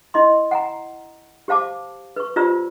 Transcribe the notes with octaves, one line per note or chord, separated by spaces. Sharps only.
E4 D#5 C6
F#5 G#5 A#5
G4 C5 F5 A5 D6
B4 C#6
F4 G4 C5 D5 A#5 E6